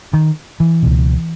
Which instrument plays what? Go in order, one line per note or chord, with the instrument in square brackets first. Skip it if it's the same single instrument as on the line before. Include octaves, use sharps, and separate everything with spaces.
[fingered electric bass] D#3
E3
C#2 B2